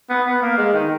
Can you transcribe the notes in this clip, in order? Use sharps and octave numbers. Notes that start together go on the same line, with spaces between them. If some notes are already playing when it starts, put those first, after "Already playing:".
B3
B3
A#3
G#3
D#3